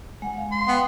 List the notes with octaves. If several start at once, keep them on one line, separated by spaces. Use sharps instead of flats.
G#3 F#5
F5
C6
B3 G5